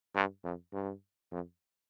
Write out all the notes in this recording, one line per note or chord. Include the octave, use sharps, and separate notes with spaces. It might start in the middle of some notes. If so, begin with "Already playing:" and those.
G2
F2
G2
F2